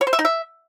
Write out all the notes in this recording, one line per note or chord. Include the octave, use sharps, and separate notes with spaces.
C#5
C5
E5
D#4
E5